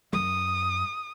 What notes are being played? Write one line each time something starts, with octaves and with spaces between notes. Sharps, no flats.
F#2 D#6